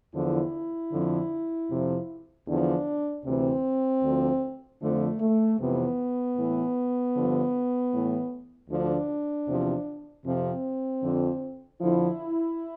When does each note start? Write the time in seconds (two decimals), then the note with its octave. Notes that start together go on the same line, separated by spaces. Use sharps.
0.14 E2 D3 F3 E4
0.92 F2 D3 F3
1.70 F2 C3 F3
2.47 E2 D3 F3 D4
3.25 D2 C3 E3 C4
4.03 D2 D3 F3
4.81 F2 D3 F3 A3
5.20 A3
5.58 F2 C3 E3 B3
6.37 A2 E3
7.14 G2 D3 F3
7.92 A2 E3
8.69 D2 D3 F3 D4
9.47 E2 C3 F3
10.25 F2 C3 F3 C4
11.03 F2 D3 F3
11.80 F2 D3 F3 E4